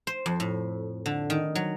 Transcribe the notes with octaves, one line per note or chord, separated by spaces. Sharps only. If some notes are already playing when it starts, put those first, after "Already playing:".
C5
F2
A2
D3
D#3
F#3